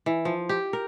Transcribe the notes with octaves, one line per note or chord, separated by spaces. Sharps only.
E3
F3
G4
A#4